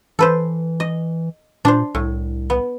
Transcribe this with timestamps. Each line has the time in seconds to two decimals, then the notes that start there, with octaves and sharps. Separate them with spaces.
0.19 E3 A4 B4 C5
0.80 D#5
1.65 A#2 D4 C5
1.95 C2 A2
2.50 B3